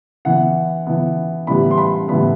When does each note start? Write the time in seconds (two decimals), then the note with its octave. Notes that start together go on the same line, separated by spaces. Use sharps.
0.25 E3 B3 F#5
0.87 E3 B3
1.47 A2 E3 G3 B3 B5
1.71 C6
1.78 B5
2.08 A2 E3 G3 B3 B5